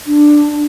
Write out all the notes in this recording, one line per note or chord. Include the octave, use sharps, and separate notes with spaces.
D4